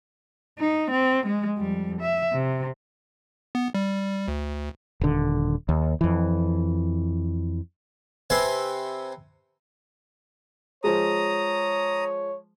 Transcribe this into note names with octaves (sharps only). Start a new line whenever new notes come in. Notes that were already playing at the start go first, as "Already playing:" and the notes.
D#4
C4
G#3
F2 G3
E5
C3
B3
G3
D2
D#1 D3
D#2
F2 E3
C3 C4 B4 G#5 C6
F3 G#3 C#5 A#5 D#6